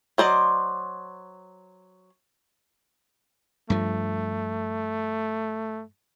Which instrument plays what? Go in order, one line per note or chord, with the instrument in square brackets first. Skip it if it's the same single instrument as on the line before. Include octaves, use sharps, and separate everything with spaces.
[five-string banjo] F#3 C5 D5 D#5
[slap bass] G2 F3 [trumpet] A3